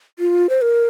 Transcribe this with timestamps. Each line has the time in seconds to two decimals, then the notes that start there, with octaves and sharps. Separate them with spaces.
0.19 F4
0.49 C5
0.62 A#4